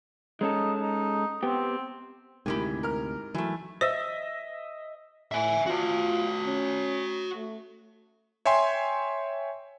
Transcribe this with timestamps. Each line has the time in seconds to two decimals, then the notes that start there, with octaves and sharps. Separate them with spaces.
0.41 G#3 C#4 D#4 A4
0.81 D#4
1.43 B3 C4 G4
2.46 D2 G#2 C3 D#3 E4 G4 G#4
2.83 A#4 F6
3.34 E3 F#3 A3
3.81 C5 D#5 E5
5.32 A2 E5 G#5
5.66 F4 F#4 C5
6.46 C#4
7.35 A3
8.45 C#5 E5 G5 G#5 C6